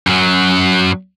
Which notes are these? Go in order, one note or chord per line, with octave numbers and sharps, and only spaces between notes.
F#2 F#3